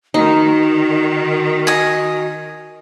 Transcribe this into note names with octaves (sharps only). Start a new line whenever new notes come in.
D#3 D#4 F#4
D#5 G#5